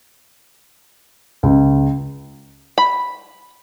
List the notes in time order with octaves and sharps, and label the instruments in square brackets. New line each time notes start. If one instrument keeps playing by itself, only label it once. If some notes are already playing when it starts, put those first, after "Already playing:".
[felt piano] C#2
[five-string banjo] B5